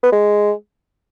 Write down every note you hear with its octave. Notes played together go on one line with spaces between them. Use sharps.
B3
G#3